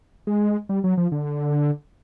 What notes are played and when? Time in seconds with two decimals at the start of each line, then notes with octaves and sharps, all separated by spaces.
0.27 G#3
0.69 G3
0.84 F#3
0.97 F3
1.12 D3